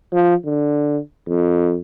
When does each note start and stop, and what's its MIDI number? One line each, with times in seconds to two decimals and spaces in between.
0.13 0.34 53
0.45 0.98 50
1.28 1.78 41